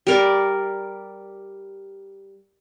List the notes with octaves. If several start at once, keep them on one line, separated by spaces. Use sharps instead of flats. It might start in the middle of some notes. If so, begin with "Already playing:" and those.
G3 A#4 D5